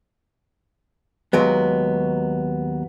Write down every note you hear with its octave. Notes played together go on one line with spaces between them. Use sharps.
D#2 F#3 G#3 B3